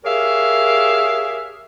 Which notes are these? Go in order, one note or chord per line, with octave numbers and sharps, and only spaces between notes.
G4 G#4 A#4 C#5 E5 F5